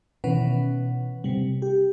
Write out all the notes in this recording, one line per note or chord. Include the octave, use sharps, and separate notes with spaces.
B2 D#3 E3 C#4 B4 F#5
C3 G3
G4